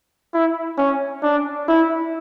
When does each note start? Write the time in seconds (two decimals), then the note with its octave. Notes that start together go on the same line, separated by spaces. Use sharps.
0.34 E4
0.78 C#4
1.23 D4
1.68 E4